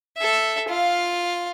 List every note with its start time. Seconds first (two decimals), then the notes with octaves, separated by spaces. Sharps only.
0.18 A4 E5
0.69 F4 F5